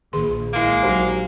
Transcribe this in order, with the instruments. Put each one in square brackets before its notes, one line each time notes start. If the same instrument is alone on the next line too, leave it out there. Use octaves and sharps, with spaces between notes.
[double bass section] A#1 [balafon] D#3 G#4 C6
[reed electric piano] C2 E4 [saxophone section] G#3 A#3
[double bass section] A#1 [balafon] F#3 D#4 G4 [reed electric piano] F#4 A#4 C5